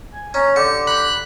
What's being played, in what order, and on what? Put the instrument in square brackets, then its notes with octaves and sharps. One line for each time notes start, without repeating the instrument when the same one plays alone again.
[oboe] G#5
[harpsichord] C#4 [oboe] A#5
[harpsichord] D3 [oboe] G4 [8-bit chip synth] C#7
[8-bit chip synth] B5 F#6